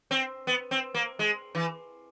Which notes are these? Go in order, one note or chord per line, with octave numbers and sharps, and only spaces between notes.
C4
B3
C4
A#3
G#3
E3